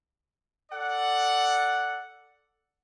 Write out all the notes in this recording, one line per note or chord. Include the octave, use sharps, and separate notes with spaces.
A4 D5 F#5